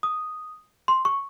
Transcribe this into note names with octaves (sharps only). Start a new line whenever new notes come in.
D#6
C6
C#6